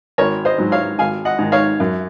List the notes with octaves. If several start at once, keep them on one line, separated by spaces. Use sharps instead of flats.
G#1 A#4 C#5
C5 D#5
G#2 F#3
C#5 F5
G#1 F5 G#5
D#5 F#5
G#2 D#3
C#5 F5
F#2